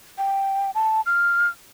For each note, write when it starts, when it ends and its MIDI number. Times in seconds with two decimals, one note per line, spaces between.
0.18 0.71 79
0.75 1.01 81
1.06 1.48 89